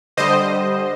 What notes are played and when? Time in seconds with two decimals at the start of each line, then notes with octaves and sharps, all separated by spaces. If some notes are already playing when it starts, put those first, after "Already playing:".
0.17 D3 G3 C5 D#5